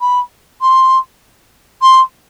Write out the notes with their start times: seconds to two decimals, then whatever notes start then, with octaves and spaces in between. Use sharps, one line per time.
0.01 B5
0.61 C6
1.82 C6